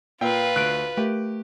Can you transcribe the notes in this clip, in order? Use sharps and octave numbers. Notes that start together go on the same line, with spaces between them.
A#2 F4 B4 F5 G5 E6
D2 F#6 D7
A3 G4 A#4